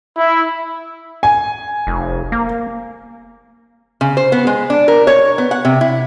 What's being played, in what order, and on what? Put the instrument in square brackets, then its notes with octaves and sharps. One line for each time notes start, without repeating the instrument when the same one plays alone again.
[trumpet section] E4
[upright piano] G#5
[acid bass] F1
A#3
[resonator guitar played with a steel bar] C#3
C5
B3
G#3
D4
A#4
C#5
B3
F#5
C3
E4